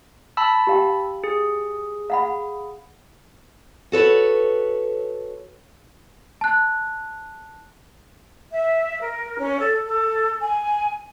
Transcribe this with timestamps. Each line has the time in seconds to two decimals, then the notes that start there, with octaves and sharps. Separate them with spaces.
0.37 A5 B5 E6
0.67 G4 F5 G5
1.24 G#4
2.10 F5 F#5 B5
3.92 F#4 A4 B4 C#5
6.41 A5 F#6
8.51 E5
9.01 A#4
9.38 C#4
9.58 A4
9.85 A4
10.40 G#5